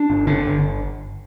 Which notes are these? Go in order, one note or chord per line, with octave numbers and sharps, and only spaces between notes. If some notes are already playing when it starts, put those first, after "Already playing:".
Already playing: D4
G1
D3
G1